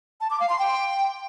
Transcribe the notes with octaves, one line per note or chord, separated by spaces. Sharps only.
A5
D6
F5
C6
G5